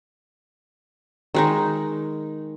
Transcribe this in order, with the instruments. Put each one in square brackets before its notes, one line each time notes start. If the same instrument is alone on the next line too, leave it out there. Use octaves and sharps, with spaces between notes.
[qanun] D#3 G#3 D#4